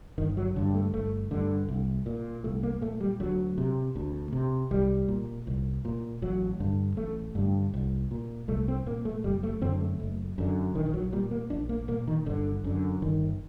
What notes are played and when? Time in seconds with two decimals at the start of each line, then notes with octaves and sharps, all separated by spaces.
0.18 G1 D#3
0.37 F#3
0.56 G2 D3
0.74 A3
0.94 G1 A3
1.31 G2 D3
1.68 C2
2.06 A#2
2.44 C2 A3
2.63 A#3
2.81 A#2 A3
3.01 G3
3.20 D2 F#3
3.58 C3
3.96 D2
4.33 C3
4.71 C2 G3
5.08 A#2
5.47 C2
5.85 A#2
6.22 A1 F#3
6.60 G2 D3
6.97 A1 A3
7.35 G2 D3
7.74 C2
8.11 A#2
8.48 C2 A3
8.68 C4
8.86 A#2 A#3
9.05 A3
9.24 F#1 G3
9.43 A3
9.61 F#2 D3 C4
9.81 A3
10.00 F#1
10.38 F#2 D3
10.75 A#1 D#3
10.86 D#3
10.94 F#3
11.12 A#2 G3
11.31 A#3
11.50 A#1 D4
11.69 A#3
11.88 A#2 A#3
12.07 D#3
12.26 G1 D3
12.64 F#2 D3
13.02 G1 D#3